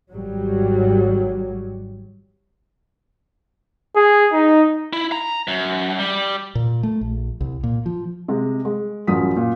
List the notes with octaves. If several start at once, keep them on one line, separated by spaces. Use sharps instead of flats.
G#1 F#3 G3
G#4
D#4
E4
A#5
F#2
G3
A#2
A3
A#1
C2
A#2
F3
C3 G#3
G#3
A1 F#2 F4 D#6 B6
A#2